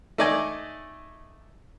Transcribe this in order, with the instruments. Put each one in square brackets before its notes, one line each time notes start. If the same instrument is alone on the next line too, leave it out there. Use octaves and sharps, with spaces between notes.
[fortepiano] A3 D#4 D5 D#5 G#5